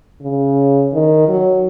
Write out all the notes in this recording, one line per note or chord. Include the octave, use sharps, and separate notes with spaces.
C#3
D#3
F#3